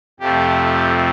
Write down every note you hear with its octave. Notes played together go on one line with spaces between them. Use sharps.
F2 C3 F3 A3 G4